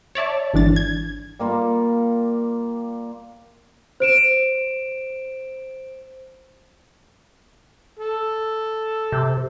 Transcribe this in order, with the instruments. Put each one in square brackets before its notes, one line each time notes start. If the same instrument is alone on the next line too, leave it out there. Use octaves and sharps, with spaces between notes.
[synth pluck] C#5 D5 E5 A5
G#1 E3 D4 A6
G#6
[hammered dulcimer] G3 A#3 F4
[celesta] C5 D7 E7
[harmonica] A4
[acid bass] C3